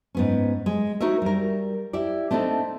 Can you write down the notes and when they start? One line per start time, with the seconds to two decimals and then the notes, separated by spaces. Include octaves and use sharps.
0.15 G#2 B3 C#4
0.66 G#3
1.01 D#4 F#4 A#4 C#5 E5
1.22 G3 A#4
1.93 E4 G4 D5
2.31 A3 C4 D4 D#4 A4